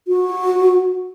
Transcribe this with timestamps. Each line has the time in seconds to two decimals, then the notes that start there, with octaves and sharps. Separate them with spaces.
0.08 F#4